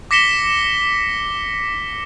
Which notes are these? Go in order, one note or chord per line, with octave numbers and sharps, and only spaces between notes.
D6 A#6 B6 C#7 E7 G7